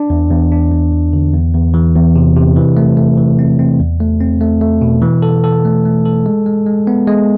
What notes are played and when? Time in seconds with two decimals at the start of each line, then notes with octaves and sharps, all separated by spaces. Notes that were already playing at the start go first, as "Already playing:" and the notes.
Already playing: D4
0.10 E2
0.30 E2
0.52 D4
0.72 E2
0.93 E2
1.13 D3
1.33 E2
1.54 E2
1.74 E3
1.95 E2
2.16 C3
2.36 C3
2.57 E3
2.77 A3
2.97 A3
3.18 E3
3.39 C4
3.59 C4
3.80 E2
4.00 A3
4.21 C4
4.41 A3
4.61 A3
4.81 B2
5.02 E3
5.22 A4
5.44 A4
5.65 A3
5.85 A3
6.05 A4
6.26 G#3
6.46 G#3
6.66 G#3
6.87 B3
7.07 G#3